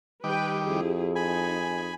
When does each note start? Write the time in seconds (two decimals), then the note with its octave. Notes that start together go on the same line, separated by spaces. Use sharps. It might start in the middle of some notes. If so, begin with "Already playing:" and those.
0.24 D#3 G3 G4 B4 G5 D6
0.65 F2 E4 G4 G#4
1.16 D#4 G#4 G#5 B5